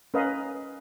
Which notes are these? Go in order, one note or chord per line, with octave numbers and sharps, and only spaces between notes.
C#4 A#4 B4 D#5 F5